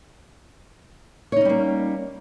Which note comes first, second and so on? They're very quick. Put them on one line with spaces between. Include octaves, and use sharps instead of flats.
C#5 D#4 C#4 G3 A#3